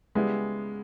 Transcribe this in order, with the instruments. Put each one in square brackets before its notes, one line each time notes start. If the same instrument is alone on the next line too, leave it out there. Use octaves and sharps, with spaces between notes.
[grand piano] C#3 G3 B3 E4 [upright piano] G#3